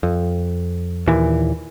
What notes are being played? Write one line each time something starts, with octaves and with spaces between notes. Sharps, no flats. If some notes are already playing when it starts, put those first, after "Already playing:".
F2
D#2 A#2 E3